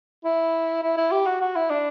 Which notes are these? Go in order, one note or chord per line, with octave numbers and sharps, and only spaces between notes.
E4
E4
E4
G4
F#4
F#4
E4
D4